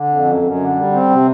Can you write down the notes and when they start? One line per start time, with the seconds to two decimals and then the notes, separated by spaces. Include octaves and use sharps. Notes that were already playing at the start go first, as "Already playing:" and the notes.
Already playing: D3
0.08 F2
0.26 F#2
0.42 F#2
0.59 D3
0.76 G3
0.93 C4
1.10 C3